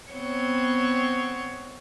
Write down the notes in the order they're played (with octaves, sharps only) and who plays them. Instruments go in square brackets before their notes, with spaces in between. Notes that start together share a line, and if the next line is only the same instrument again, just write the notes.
[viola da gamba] B3 C4 C#5